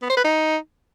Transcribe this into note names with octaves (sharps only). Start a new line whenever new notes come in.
B3
C5
B4
D#4